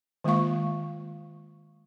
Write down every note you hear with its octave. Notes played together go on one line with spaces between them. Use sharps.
D#3 G#3 A#3 F4 F5 C#6